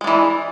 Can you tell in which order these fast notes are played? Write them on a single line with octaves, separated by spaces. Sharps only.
G#3 D4 E3